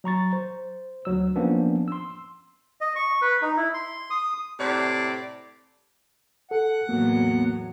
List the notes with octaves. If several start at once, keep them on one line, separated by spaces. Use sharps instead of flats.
F#3 A#5 C#6 A6
C5
D2 F#3 E6
F3 A#3 B3 C#4 D4
C6 E6
D#5
C#6
B4
D#4
E4
C6
D#6
A2 C3 D5
A4 F#5
E2 A2 F#3 A#3 B3